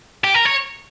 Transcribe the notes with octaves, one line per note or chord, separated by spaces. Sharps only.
G4
A#4
C#5